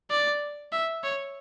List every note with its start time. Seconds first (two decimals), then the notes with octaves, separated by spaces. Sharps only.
0.11 D5
0.72 E5
1.04 C#5